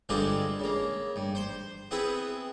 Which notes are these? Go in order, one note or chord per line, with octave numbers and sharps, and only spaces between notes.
G2 D3 G#3 C4 D4 F4
C#3 A#3
G2
C5 C6
B3 C4 E4 G#4 B4